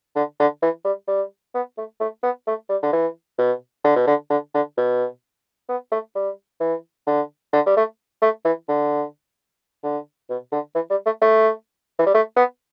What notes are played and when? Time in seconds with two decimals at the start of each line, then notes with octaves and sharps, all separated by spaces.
0.16 D3
0.40 D3
0.62 E3
0.85 G3
1.08 G3
1.55 B3
1.77 A3
2.00 A3
2.23 B3
2.47 A3
2.70 G3
2.83 D3
2.93 E3
3.39 B2
3.84 D3
3.96 B2
4.07 D3
4.30 D3
4.54 D3
4.77 B2
5.69 B3
5.92 A3
6.15 G3
6.60 E3
7.07 D3
7.53 D3
7.66 G3
7.77 A3
8.22 A3
8.45 E3
8.69 D3
9.84 D3
10.30 B2
10.52 D3
10.75 E3
10.90 G3
11.06 A3
11.22 A3
11.99 E3
12.07 G3
12.14 A3
12.37 B3